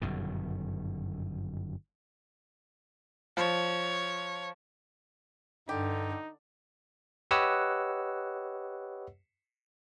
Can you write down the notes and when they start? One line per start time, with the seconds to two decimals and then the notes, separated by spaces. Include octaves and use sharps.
0.02 G1 F#2 B2 D#3
3.37 F3 C#5
5.69 G2 D3 D#4 G4
7.31 G4 B4 C#5 D#5 F#5 E6